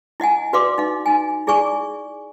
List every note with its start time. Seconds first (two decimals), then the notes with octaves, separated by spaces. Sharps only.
0.20 E4 D#5 F#5 G#5
0.53 F#4 B4 D5 F5 C6 D6
0.78 D#4 F5
1.06 D#4 G#5
1.47 E4 G#4 D5 G#5 C#6